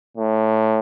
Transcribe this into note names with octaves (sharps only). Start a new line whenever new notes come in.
A2